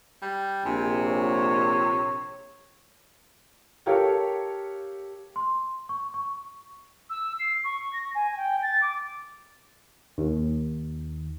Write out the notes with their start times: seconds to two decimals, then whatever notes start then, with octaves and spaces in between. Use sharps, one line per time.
0.22 G3
0.65 A#1 C3 G#5
1.07 C#5
3.86 G4 A4 A#4 C#5 F5 G5
5.36 C6
5.89 C#6
6.14 C#6
7.10 E6
7.39 C7
7.64 C#6
7.93 A#6
8.14 G#5
8.37 G5
8.62 A6
8.81 D6
10.18 D#2